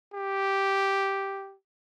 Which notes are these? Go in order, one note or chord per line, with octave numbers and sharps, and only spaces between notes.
G4